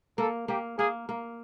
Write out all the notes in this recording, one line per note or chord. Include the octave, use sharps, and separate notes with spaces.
A#3 A4
A#3 G4
A#3 G#4
A#3